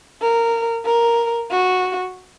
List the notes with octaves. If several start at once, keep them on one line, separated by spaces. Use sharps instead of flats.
A#4
A#4
F#4